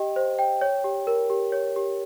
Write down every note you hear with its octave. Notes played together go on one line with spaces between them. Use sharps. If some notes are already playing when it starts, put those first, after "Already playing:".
Already playing: G4 D#5 G5
C5
G5
C#5
G4
A#4
G4
C#5
G4